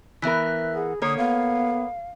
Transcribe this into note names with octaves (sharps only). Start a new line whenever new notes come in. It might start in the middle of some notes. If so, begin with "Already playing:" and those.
E3 B3 A#4 E5 F#6 B6
G#4 F#5
D3 A#3 A4 C#5 D#6
B3 F5